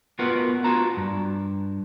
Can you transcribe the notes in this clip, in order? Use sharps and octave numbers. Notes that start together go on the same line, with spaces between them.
B3 F4 F#4 A#4 B4
F4 F#4 A5 A#5
G2